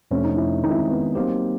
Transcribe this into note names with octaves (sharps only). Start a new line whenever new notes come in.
F2 C3 F3 A3 C#4 D4
D#4
E4
D#3 G#3 C4 D#4
E4
D#4
B3
F#3 A#3 C4 D#4 G4